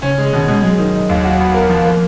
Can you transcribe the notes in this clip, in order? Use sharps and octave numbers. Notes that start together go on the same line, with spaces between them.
C#3 C#4
G#3
B2 D#3
B2 G#3
F#3 G#3
D#3
D#4
D#2
F#4
B3
A#4
F3
F3 A#3